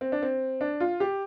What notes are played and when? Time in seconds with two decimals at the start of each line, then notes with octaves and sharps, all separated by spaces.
0.01 C4
0.12 D4
0.22 C4
0.61 D4
0.80 F4
1.00 G4